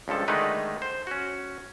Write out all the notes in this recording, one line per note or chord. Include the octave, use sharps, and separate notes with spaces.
C#2 G2 F3 A4
D3 D#3 G#3 A3 D#4 B4
C5
C#4 F#4